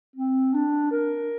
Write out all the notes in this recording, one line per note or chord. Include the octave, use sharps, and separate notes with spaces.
C4
D4
A#4